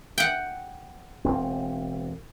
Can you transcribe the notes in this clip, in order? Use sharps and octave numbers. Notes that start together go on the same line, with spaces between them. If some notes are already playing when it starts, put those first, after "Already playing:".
F#5 G5
E1 C4